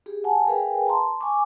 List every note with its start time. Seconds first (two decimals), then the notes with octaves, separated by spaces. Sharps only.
0.06 G4 G#4
0.24 F#5 G#5 A5
0.47 G#4 A#4 B4 F5 G5 G#5
0.87 A5 A#5 C6
1.21 G#5 C#6 D6